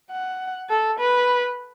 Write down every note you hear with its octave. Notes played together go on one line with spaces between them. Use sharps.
F#5
A4
B4